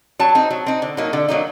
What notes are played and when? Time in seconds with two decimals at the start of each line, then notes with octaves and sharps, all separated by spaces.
0.19 F#3 A5
0.35 C4 D#4
0.50 F#3
0.66 C4 D#4
0.82 D3
0.97 F#3 A#3 D#4
1.13 D3
1.28 F#3 A#3 D#4